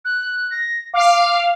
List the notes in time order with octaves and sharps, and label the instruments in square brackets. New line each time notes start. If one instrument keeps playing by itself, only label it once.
[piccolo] F#6
A#6
[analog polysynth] F5 [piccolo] D6